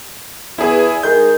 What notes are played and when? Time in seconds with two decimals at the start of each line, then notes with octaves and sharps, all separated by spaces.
0.58 E2 E4 G#4
1.03 D#3 G#3 G6